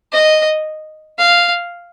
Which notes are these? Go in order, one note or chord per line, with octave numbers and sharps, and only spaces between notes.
D#5
F5